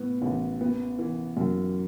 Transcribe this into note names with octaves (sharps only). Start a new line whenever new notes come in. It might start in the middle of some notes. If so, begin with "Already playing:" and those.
Already playing: A2 B3
A1
B3
E3
F#2